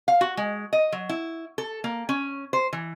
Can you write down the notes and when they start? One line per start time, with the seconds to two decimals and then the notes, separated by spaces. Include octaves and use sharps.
0.08 F5
0.21 F#4
0.37 G#3
0.73 D#5
0.92 F#3
1.09 E4
1.58 A4
1.84 A#3
2.09 C#4
2.53 C5
2.73 E3